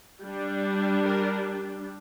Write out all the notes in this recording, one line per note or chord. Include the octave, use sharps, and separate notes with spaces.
G3 D4
A#4